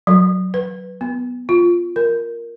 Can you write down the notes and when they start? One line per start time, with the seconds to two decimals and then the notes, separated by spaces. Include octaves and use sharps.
0.07 F#3
0.54 B4
1.01 B3
1.49 F4
1.96 A#4